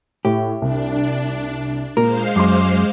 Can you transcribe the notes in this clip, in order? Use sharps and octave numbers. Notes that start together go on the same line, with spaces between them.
A2 G4
C2 D4
A#2 G#3 A#4 C5 F5
F#2 C6 D6